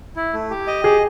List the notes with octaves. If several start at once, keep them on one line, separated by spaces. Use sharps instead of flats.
E4
A3
G4
D#5
G4 G#4